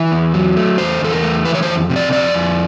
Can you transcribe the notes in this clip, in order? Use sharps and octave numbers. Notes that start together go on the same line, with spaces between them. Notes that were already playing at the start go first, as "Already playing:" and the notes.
Already playing: E3 E5
E2
F#3
A3
E2 C5
E2 A4
A#4
A3
E3 B4
C#5
F2 C5
C3
D5
F2 D5
F2